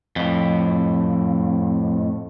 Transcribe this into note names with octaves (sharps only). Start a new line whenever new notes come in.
F2 A2